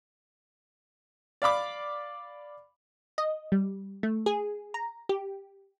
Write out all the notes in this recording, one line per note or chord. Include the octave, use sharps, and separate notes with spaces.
D5 F5 B5 D6
D#5
G3
A3
G#4
A#5
G4